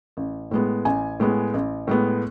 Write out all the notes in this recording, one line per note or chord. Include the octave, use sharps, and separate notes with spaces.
A1
A2 G#3 B3
A1 G#5
A2 G#3 B3
A1
A2 G#3 B3